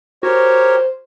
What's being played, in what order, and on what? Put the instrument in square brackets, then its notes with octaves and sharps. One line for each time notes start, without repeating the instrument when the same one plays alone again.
[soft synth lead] F#4 [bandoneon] G4 A#4 C#5 [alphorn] C5